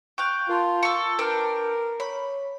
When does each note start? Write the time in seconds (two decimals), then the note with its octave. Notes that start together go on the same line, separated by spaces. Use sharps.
0.18 F5 G5 C#6 F#6 G6
0.49 F4 A#4 A5 C6
0.83 A4 C#6
1.19 D4 A#4 B4 G5 F6
2.00 C#5 B5